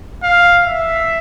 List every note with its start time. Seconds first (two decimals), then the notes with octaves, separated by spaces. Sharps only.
0.23 F5
0.66 E5